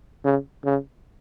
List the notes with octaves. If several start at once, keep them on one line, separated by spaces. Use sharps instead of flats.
C#3
C#3